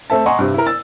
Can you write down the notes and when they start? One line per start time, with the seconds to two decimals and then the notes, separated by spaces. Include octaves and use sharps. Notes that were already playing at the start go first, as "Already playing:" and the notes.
0.10 A3 C4 A4 E5 A5
0.26 D#5 F#5 G#5 A#5 C6 C#6
0.39 G2 C3
0.54 E4 A#4
0.66 E6 A6